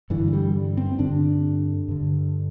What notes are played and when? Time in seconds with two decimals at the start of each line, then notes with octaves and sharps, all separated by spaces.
0.10 G2 D3 E3
0.33 G3
0.77 C4
0.99 G2 D3 D4
1.88 G2 D3